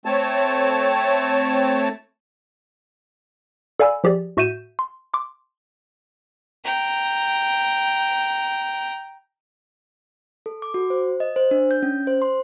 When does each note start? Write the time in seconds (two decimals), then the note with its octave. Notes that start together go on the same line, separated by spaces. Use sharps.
0.05 A3 C4 C#5 A5
3.80 A4 D5 F5 G#5 B5 E6
4.04 F3 G4 G#4 D5
4.37 A2 F#4 E5 G6 D#7 E7
4.79 C6
5.14 C6 D6
6.65 G5 A#5
10.46 A4
10.62 D6
10.74 F#4
10.90 C5
11.20 D#5
11.36 C5
11.51 D4
11.71 G6
11.83 C#4
12.07 C5
12.22 C6